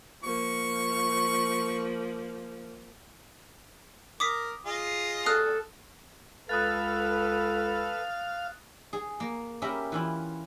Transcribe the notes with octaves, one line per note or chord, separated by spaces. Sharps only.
F3 A#3 C#6
A#4 D6 D#6 B6
F4 G#4 D#5
A4 D#6 F6 F#6
C#2 A4 B4 F5 D#6 F#6 A6
G#4
A#3
C#4 G4 A#4 E5 B5
E3 E4 F4